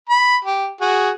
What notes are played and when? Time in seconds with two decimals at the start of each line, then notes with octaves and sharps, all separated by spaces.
0.09 B5
0.45 G4
0.81 F#4 G#4